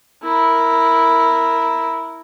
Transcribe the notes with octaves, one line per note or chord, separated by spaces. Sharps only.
E4 A#4